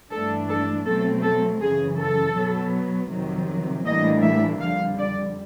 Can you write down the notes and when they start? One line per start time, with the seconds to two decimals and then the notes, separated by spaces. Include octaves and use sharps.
0.11 G2 E3 A3 D4 A4
0.48 A4
0.85 B2 F#3 A3 C4 A4
1.23 A4
1.60 F#2 C#3 E3 G#4
1.98 A4
2.35 B2 F#3 B3
3.10 F2 C3 D#3 F#3
3.85 A2 E3 G3 A#3 D4 D#5
4.23 E5
4.60 F2 D3 G3 F5
4.98 D5